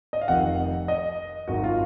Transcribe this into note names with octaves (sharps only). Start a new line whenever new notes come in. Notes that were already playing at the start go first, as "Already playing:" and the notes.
D#5
F5
F1 F2 D#3 F#5
D#5
G#1 F#2 D#3 F#3 F#4
F4